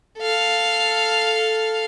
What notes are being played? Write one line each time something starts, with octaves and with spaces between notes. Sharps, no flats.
A4 F5